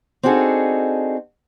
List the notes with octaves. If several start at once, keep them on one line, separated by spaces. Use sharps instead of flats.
C4 D4 D#4 F#4 G#4 A4